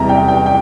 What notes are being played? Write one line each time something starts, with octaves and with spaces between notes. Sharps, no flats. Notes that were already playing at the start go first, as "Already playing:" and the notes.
Already playing: E2 C3 E3 G3 A#5
G5
G5
G5